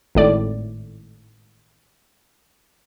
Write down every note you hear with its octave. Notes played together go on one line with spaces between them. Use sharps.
G#1 A2 D5